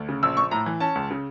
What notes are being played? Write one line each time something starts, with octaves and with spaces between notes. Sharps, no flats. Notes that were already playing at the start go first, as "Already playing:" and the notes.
Already playing: D2
C#3
A#1 E6
A#1 C#6
A2 A#5
E3
C#4 A5
C#2
C#3